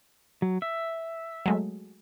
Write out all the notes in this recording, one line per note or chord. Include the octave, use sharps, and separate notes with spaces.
F#3
E5
F#3 G#3 A3